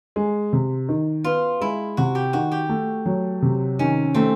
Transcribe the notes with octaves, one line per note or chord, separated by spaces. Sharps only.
G#3
C3
D#3
B3 F4
G#3 E4
C3 F#4
G4
D#3 F#4
G4
A3
F#3
C3
D#3 C#4
A3 C4